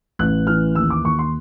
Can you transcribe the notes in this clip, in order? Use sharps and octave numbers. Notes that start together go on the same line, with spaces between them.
A1 F#6
E3 F6
D#2 E6
D6
D#2 C#6
C6